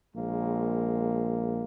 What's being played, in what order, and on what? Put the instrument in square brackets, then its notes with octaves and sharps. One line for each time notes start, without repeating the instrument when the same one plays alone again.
[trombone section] A#1 G#3 A#3